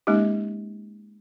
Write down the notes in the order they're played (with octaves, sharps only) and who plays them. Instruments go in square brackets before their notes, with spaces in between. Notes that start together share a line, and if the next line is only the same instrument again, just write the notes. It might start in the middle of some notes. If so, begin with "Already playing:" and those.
[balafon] G#3 A#3 C#4 D#4 G4